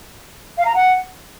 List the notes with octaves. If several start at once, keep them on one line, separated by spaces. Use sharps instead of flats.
F5
A#5
F#5